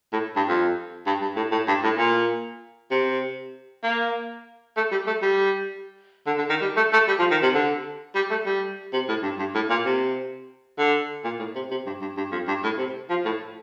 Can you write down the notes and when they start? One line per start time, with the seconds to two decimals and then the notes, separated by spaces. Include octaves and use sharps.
0.13 A2
0.36 G2
0.48 F2
1.06 G2
1.21 G2
1.36 A2
1.51 A2
1.67 G2
1.83 A2
1.98 A#2
2.91 C3
3.83 A#3
4.77 A3
4.91 G3
5.07 A3
5.22 G3
6.27 D3
6.38 D3
6.50 D#3
6.62 G3
6.77 A3
6.92 A3
7.08 G3
7.19 F3
7.31 D#3
7.42 C3
7.54 D3
8.15 G3
8.31 A3
8.46 G3
8.93 C3
9.08 A2
9.23 G2
9.39 G2
9.55 A2
9.70 A#2
9.85 C3
10.78 D3
11.24 A#2
11.39 A2
11.55 C3
11.71 C3
11.86 G2
12.01 G2
12.17 G2
12.32 F2
12.48 G2
12.63 A2
12.78 C3
13.10 F3
13.25 A2